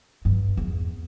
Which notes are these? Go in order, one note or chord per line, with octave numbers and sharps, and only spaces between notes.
G2
E2